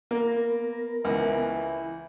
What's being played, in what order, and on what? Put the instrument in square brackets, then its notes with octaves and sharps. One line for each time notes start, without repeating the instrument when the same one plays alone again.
[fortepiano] A#3 [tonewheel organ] B3 A#4
[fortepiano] C#2 [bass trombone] E3